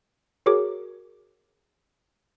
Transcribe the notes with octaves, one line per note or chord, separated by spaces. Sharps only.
F#4 G#4 A#4 C#5 D6